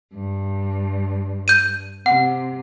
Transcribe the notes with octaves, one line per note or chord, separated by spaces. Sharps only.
G2
G6 D#7
C3 F#5